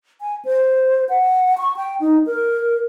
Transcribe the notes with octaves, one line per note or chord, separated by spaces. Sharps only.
G#5
C5
F#5
C#6
G5
D#4
A#4